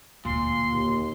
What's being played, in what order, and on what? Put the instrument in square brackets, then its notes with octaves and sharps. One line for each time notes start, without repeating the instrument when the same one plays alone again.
[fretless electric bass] E1 D2 [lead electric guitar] A#2 [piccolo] C6
[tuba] D#2